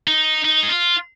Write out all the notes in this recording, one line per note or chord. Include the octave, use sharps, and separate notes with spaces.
D#4
D#4
G#4
F4